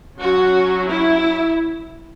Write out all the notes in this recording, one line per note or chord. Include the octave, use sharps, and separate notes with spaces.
F#3 C#4 F#4
E4